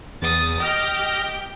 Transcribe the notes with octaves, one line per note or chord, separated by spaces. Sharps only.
E2 D#6 A6
G4 D#5 F6 A#6